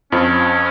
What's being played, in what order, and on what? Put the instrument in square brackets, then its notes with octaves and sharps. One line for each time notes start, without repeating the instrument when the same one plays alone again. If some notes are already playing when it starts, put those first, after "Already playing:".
[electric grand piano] F2 F3 [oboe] C#4